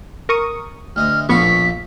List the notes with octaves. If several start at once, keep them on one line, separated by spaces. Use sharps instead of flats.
A#4 C#6 D#6
D2 D#5 F6
A#1 A2 F3 B3 A4 C#6 B6